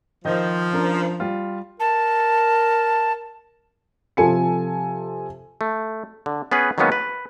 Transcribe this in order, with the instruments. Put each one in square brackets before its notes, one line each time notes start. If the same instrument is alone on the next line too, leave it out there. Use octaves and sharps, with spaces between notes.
[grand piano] D#3 D#5 G6 [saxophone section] F3
[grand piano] C#4 D4 A#4
G3 F4
[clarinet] A#4 [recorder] A5
[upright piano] C3 F3 F4 A4 G#5 C#7
[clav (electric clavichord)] A3
D3
B3 C#4 G#4 B4
D#3 F#3 G#3 A#3 B3 C#4
B4